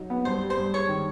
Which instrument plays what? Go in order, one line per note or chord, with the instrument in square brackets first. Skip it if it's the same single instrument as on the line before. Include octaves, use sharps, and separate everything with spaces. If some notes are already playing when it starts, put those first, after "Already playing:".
Already playing: [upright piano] F#3 D#4
B3
[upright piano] G2 [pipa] C5
[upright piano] G3
[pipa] C5
[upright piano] G2
[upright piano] G#3 [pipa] C#5
[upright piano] D#3